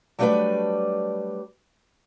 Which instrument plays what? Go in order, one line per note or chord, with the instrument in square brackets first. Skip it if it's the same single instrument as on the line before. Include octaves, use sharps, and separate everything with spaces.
[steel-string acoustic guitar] F#3 G3 A3 D4 B4 D5